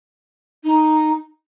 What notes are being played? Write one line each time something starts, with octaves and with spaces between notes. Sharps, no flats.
D#4